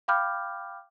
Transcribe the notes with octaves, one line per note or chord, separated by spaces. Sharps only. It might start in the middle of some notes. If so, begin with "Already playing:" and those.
F5 G5 B5 D6 F6 G6